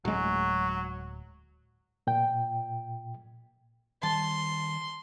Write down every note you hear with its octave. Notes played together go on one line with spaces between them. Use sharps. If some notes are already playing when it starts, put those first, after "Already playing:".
D1 F#3 G#3
A#2 G5
D#3 G3 A5 C6